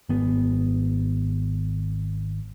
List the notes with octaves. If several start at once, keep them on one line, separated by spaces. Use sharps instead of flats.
G#1 B3